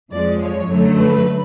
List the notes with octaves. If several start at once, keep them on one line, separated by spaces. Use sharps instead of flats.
F2 F3 G#3 D5
C#5
F#2 D3 F#3 A3
B4